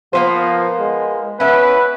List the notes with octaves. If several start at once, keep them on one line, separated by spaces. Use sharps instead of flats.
F3 A#3 B3 C5
G#3
B3 C#4 E4 B4